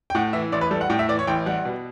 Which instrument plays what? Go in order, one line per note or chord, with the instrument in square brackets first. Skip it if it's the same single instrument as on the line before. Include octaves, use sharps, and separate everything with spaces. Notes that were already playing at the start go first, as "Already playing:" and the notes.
[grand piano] G5
A2 F#5
E3 E5
A1 D5
B4
G3 A4
F#5
A2 G5
E5
E3 D5
C#5
A1 G5
G3 F#5
B2